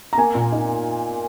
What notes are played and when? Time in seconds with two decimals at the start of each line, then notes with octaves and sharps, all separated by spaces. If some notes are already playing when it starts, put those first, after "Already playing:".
0.13 A#5
0.18 A#3 G#5
0.35 A#2
0.52 D#4